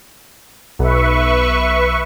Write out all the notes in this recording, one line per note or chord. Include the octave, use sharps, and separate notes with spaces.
B1 B4 E5 C#6